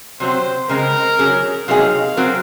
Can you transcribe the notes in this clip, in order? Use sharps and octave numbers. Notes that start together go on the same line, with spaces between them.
C3 F#3 C4 C5
C#3 G#3 C4 A#4
F#3 C#4 G#4
C3 F#3 A#3 D#4 G#4 F5
F#3 C4 F#4 A#4